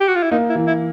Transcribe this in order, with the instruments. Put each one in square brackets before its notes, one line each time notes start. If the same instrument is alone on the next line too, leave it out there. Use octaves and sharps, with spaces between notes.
[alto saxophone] G4
F#4
F4
E4
[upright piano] A#3 [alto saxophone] D#4
[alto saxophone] E4
[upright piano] E3
[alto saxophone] E4